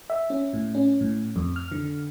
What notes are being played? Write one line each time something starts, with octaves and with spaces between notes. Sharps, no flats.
E5
C#4
A2
C#4
A2
F2
F6
D3